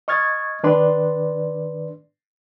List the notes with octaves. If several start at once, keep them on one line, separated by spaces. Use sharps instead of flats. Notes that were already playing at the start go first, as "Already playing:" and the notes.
D#5 C#6 F6 G#6 A6
D#3 D4 B4 D5 C6